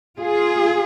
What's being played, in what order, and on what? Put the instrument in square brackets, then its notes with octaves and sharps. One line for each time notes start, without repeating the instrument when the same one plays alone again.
[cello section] F4 G#4